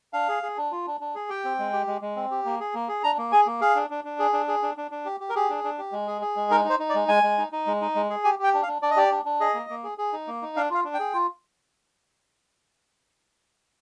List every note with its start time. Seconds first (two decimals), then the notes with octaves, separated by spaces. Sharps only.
0.13 D4 F5
0.28 G#4
0.43 G#4
0.57 D4
0.71 F4
0.87 D4
1.01 D4
1.15 G#4
1.29 G4 G5
1.45 C4
1.59 G#3
1.73 G4
1.87 G#3
2.02 G#3
2.16 C4
2.31 G4
2.45 A#3
2.60 G#4
2.74 A#3
2.88 G#4
3.03 D4 A#5
3.18 A#3
3.32 G#4 G#5
3.47 A#3
3.61 G#4 F5
3.75 D4
3.90 D4
4.04 D4
4.19 G#4
4.33 D4
4.48 G#4
4.62 D4
4.77 D4
4.91 D4
5.05 G4
5.20 G4
5.29 A#4
5.35 G4 G#4
5.50 D4
5.64 D4
5.78 G4
5.92 G#3
6.07 G#4
6.22 G#4
6.36 G#3
6.50 D#4 A#4
6.65 D#4 C5
6.80 D#4
6.89 D5
6.95 G#3
7.08 G#3 G#5
7.23 G#3
7.38 D#4
7.52 D#4
7.67 G#3
7.82 D#4
7.95 G#3
8.10 G#4
8.24 G4 G#5
8.39 G4 G5
8.54 D4
8.63 F5
8.68 D4
8.82 D4 D5
8.91 D#5
8.97 G4 D5
9.12 D4
9.25 D4
9.40 G#4 D#5
9.54 A#3
9.70 A#3
9.83 G#4
9.98 G#4
10.13 D#4
10.27 A#3
10.42 D#4
10.56 D4 F5
10.70 F4 F5
10.85 D4
10.94 G5
10.99 G#4
11.13 F4